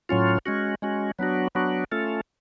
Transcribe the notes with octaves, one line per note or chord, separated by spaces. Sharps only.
A2 F#3 C#4 F4
G#3 C#4 F#4
G#3 C#4 F#4
F#3 B3 D4 F#4
F#3 B3 D4 F#4
A3 C#4 F4 A4